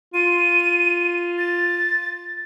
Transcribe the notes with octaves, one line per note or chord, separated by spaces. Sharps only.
F4 D#7
A6